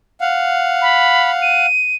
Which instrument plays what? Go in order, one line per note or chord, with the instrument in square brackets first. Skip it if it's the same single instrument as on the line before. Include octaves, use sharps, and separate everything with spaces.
[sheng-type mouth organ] F5 F#5
[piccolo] B5
D#7